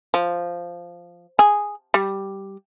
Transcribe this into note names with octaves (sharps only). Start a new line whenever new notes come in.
F3
G#4
G3